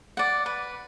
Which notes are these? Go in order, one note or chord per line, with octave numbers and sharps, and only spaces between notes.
D5 F#5
B4